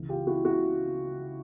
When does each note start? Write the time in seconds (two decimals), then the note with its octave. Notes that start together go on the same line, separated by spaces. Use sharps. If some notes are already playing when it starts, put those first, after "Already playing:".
Already playing: C#2 C#3 E3
0.09 F4 G4
0.27 E4 F#4
0.44 E4 F#4